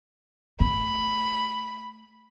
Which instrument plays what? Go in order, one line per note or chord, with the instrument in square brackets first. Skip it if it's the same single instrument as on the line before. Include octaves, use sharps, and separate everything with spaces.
[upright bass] A3 [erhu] B5